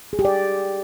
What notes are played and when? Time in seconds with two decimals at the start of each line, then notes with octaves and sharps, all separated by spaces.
0.13 G#4
0.19 G4
0.25 D5